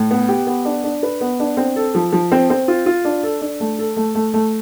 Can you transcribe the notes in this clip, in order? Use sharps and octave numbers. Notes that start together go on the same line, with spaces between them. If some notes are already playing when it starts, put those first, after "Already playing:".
Already playing: A2
B3
G4
B3
D4
D4
B4
B3
D4
C4
A4
F3
F3
C4
C4
F4
F4
D4
A4
D4
A3
A4
A3
A3
A3